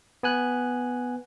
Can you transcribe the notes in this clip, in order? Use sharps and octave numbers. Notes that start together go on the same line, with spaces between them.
B3 G#5 F#6